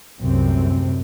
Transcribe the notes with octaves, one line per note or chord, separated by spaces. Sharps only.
C2 F#2 A2 C3 C4